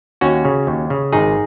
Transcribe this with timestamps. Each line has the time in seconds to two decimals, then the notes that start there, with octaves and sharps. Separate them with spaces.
0.21 D#2 C#4 F#4
0.45 C#3
0.67 D#2
0.90 C#3
1.12 G#1 D#4 G#4